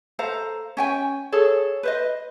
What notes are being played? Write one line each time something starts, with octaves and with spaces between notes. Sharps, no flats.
A4 C5 F5 A#5
C#4 G5 G#5
G#4 A4 C#5
B4 C5 D#5